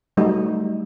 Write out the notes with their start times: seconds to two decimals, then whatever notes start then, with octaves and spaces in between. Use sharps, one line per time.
0.17 F#3 G3 A3 D#4